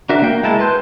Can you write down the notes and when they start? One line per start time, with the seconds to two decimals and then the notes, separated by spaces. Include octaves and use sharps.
0.09 D4 F#4 A#4 E5
0.22 A#3 G5
0.43 G#3 E4 A5
0.59 B4 A5 C6 G6